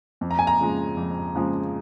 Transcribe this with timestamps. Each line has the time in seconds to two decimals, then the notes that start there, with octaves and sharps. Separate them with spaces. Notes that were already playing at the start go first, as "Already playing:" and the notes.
0.21 F2
0.31 A#5
0.39 G#5
0.47 A#5
0.59 C#3 F3 G#3
0.97 F2
1.35 C#3 F3 G#3